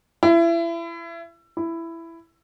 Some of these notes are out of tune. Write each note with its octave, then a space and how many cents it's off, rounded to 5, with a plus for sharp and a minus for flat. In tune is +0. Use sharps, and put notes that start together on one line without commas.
E4 +30
E4 +10